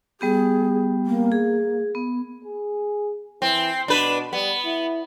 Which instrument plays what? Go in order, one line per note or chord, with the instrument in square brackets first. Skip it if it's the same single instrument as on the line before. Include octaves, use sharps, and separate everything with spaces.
[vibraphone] G3 B3 G4 [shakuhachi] G#4
[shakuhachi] A#3
[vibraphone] G#4
B3
[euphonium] G#4
[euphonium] E3 [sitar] C4
[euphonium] B2 [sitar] D4 B4
[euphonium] G3 [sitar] B3
[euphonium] E4